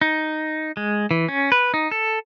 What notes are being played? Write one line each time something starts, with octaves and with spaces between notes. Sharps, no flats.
D#4
G#3
E3
C#4
B4
D#4
A4